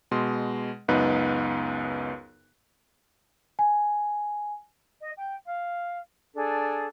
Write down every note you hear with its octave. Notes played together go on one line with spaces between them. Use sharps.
B2 G#3 C6
C#2 F#2 B3 D#4 B4 F#6
G#5
D#5
G5
F5
D4 G#4 A4